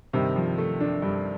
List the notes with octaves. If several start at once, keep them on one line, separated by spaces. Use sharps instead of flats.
G2 C3 D#3
F3
A3
D4
G2